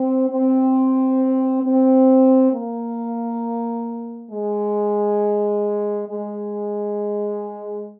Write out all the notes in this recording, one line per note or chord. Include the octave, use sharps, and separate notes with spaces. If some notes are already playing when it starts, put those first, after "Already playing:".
Already playing: C4
C4
C4
A#3
G#3
G#3